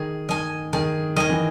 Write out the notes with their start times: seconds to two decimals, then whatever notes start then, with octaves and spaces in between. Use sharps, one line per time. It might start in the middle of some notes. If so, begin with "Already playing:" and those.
Already playing: D#3 G#4
0.29 D#3 D#5 G#5
0.73 D#3 G#4
1.16 D#3 D#5 G#5
1.30 E3